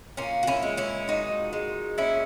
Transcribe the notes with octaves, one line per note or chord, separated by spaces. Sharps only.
A#2 A#3 C#4
F#4
C#4 E4
G#3
C#4 E4
A#2 D#4 F#4
G#3
A#2 C#4 E4